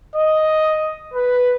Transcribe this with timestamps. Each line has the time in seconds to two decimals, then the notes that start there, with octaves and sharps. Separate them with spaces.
0.15 D#5
1.14 B4